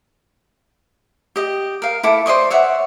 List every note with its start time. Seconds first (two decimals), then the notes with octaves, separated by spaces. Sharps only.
1.36 G4 D#5
1.82 A#4 F5
2.03 E4 A4 D6
2.26 C5 D5 D#5 C#6
2.51 C#5 E5 F#5